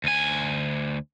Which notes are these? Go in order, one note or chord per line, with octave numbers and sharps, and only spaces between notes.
D2 G#5